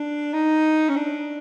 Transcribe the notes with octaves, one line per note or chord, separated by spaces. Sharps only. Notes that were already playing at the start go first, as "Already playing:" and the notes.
Already playing: D4
D#4
C#4
D4